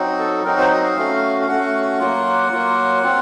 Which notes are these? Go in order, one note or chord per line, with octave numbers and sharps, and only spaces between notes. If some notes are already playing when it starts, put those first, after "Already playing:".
Already playing: F#3 C4 D#4 F#4
A4
F#3 C4 D#4 F#4 A#4
C5
D#5
F5
A3 C#4 F#4
F5
A3 C#4 F#4 F#5
F#3 A#3 F4
F#3 A#3 F4
C4 F4